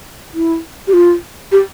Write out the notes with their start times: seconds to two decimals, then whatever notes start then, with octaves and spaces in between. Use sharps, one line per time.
0.34 E4
0.87 G4
0.93 F4
1.52 G4